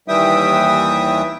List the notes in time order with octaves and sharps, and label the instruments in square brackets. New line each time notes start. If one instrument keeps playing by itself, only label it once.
[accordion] D#2 E3 G3 E5 G5 D#6